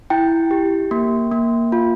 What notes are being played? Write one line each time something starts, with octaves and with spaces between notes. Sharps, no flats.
E4 G5
G4
A#3
A#3
F4